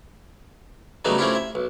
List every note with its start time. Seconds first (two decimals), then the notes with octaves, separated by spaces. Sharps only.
1.05 C#3 F#3 G3 A3 B3 D#4
1.18 A3 C4 C#4 E4 F4 G4
1.35 E5
1.55 B1